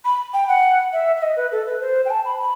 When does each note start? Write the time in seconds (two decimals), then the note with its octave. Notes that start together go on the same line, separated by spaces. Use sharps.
0.05 B5
0.34 G5
0.48 F#5
0.93 E5
1.16 E5
1.22 D#5
1.36 B4
1.52 A4
1.67 B4
1.81 C5
2.06 G5
2.10 A5
2.25 B5
2.40 B5